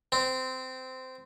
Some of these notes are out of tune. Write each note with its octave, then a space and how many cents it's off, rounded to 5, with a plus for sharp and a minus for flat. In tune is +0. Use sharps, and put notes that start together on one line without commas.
C4 -15